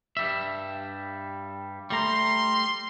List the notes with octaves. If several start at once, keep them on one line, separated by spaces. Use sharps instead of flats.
G2 G3 E5
G3 A3 A#5 C6